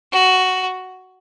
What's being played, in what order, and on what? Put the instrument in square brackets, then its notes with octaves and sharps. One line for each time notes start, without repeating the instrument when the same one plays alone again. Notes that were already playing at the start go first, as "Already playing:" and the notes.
[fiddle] F#4